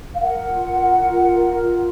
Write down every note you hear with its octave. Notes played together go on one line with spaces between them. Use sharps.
F5
A#4 F#5
F4
A#4
F4
A#4
F4